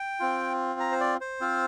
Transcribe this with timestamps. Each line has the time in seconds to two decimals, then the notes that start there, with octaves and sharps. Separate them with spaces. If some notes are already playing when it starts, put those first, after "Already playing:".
Already playing: G5
0.20 C4 F4
0.80 A#5
0.92 C5
1.00 D5
1.21 C5
1.41 C4 F4